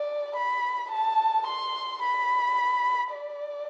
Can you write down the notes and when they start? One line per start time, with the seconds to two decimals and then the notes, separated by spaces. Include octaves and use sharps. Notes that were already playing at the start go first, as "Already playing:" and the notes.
Already playing: D5
0.36 B5
0.92 A5
1.47 C6
2.02 B5
3.14 D5